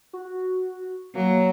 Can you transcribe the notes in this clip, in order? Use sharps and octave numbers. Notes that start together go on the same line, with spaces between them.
F#4
F#3 A#3